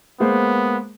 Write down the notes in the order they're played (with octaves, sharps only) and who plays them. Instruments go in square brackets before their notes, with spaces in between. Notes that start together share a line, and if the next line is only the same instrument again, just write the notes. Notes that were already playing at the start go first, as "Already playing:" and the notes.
[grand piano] G#3 A#3 C5 [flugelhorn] B3